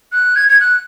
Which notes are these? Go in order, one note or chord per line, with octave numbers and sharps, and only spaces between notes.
F#6
G#6
G#6
F#6